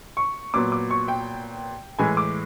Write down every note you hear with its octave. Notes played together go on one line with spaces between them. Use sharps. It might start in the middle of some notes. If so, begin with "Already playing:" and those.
C#6
A#2 F#3 B3 D6
D6
C#6
G5
A2 E3 G#3 G#5
D6